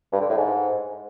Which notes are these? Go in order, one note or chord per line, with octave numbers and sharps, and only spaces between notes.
G2
D3
A2
G#2